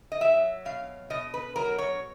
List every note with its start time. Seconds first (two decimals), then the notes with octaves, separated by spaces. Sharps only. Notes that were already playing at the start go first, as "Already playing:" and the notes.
0.12 D#5
0.21 F#3 E5
0.65 B2 F5
1.10 B2 D#5
1.34 B4
1.56 F#3 A#4
1.78 C#5